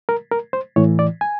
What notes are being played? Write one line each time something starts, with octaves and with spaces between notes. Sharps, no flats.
A#4
A#4
C5
A2 E3 C#5
D5
G#5